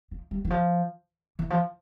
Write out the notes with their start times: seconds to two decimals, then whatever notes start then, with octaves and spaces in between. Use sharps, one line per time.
0.11 F3
0.31 G3
0.45 E3
0.50 F3
1.39 E3
1.50 F3